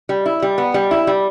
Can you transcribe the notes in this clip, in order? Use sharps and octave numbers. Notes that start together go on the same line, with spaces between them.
G3
E4
G3
B3
G3
E4
G3